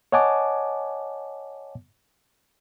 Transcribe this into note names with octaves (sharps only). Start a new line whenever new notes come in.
C#5 D#5 F#5 G#5 A5 D6